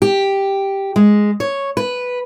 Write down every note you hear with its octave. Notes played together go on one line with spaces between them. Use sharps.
G4
G#3
C#5
B4